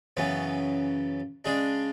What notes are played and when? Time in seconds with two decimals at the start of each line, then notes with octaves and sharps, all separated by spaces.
0.17 F#2 C#3 E3 B3
1.45 C#3 G#3 D4 G#4